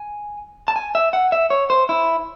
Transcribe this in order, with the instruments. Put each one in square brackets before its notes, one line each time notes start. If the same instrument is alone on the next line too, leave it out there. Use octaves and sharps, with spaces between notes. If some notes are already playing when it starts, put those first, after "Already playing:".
Already playing: [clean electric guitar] G#5
A5
G#5
E5
F#5
E5
C#5
C5
E4